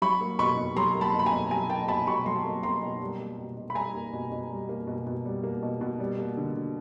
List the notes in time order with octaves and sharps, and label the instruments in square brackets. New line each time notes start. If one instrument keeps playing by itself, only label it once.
[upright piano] F#3 B5 C#6
A#3
B2 B5 C#6
B2
F#3 A#5 C6
A#3
A5 B5
B2
B5
G#5 A#5
B2
F#3 G#5 A#5
A#3 G5 A5
B2 A5 B5
B2 B5 C#6
F#3 A#5 C6
A#3
B2 A#5 C6
B2
G3
A#3
B2
B2
B5
G3 G#5 A#5
A#3
B2
B2
G3
A#3
B2
B2
G3
A#3
B2
B2
G3
A#3
D3
D3